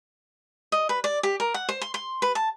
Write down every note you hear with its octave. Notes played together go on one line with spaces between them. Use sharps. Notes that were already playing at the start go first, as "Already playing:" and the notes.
D#5
B4
D5
G4
A#4
F#5
C5
C6
C6
B4
A5